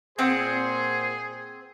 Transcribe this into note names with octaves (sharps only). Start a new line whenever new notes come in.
A#2 C4 G#4 C5 F#5